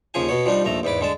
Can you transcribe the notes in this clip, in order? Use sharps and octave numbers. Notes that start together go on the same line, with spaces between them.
D#2 C#3 F3 G#4 G#5
B2 B3 C#5
F3 G3 D4 D#4
A#1 D#2 A3 A#5
E2 G#2 B4 D6
D3 G#3 A5